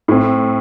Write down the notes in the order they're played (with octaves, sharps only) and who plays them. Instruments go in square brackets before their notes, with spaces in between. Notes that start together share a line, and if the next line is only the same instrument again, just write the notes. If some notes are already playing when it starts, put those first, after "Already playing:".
[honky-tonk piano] A2 [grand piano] C4